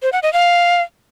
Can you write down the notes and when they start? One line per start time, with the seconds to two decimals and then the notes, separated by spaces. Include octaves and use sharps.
0.02 C5
0.13 F#5
0.23 D#5
0.33 F5